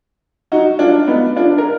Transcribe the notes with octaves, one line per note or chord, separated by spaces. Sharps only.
D#4 F#4
D4 F4
B3 D#4
D4 F4
A#4